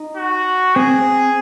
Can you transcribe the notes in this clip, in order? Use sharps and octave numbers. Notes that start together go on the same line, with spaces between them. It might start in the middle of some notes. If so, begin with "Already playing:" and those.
Already playing: D#4
F#4
C4 G#4